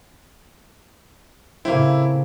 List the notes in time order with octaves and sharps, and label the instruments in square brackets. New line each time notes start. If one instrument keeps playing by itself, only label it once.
[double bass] A2 C#3 [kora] A#3 C4 [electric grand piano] E4